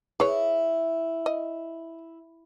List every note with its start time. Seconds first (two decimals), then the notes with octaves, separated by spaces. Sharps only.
0.20 E4 G#4 B4 C#5
1.26 D#5